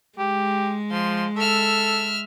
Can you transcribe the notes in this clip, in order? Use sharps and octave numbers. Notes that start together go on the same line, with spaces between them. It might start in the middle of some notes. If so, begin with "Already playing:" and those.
G#3 G4
F3 C6
A4 E5 F6